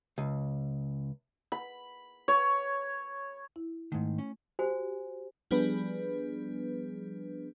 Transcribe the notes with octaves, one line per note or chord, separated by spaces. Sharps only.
C#2
B5
C#5
E4
G#2 D#3 A3
C#4
F#4 G4 C5 G#5
F3 G3 B3 D4 G#4 B4